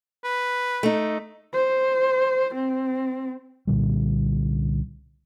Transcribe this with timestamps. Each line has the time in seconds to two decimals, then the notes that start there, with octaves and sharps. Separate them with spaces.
0.24 B4
0.83 A3 D#4
1.53 C5
2.55 C4
3.67 C2 A#2 D3 G3